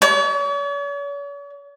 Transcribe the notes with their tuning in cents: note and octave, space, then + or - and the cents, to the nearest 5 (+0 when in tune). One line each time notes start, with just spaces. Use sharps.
C#5 +45